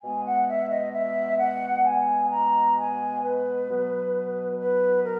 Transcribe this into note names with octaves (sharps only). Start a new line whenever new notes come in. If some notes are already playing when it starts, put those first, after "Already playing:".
B2 G#3 B3 G#5
F#5
E5
D#5
E5
F#5
G#5
A#5
G#5
B4
B2 F#3 B3
B4
A#4